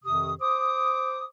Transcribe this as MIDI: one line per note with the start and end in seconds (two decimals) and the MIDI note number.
0.05 0.33 41
0.05 0.33 48
0.05 0.33 51
0.05 0.33 67
0.05 0.33 87
0.41 1.26 72
0.41 1.26 86
0.41 1.26 87